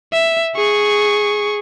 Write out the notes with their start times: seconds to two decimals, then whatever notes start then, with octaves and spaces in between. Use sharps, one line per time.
0.13 E5
0.56 G#4 C#6